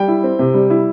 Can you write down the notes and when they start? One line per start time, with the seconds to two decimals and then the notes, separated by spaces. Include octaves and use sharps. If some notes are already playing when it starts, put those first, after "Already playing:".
Already playing: G3 G5
0.08 E4
0.24 C4
0.39 C3
0.54 G3
0.70 E4